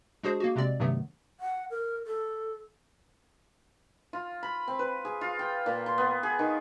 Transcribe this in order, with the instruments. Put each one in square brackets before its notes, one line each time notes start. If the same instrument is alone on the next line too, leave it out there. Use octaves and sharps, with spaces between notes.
[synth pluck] G#3 D4 F#4 G#4 C5
A#3 F#4
C3 G#3 C4 D5
G2 C3 D#3 F#3 A3 B3
[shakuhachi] F#5
A#4
A4
[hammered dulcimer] F4
B5
C4
B4
G#4
F4
G5
A#2
C6
B3
G#4
D#3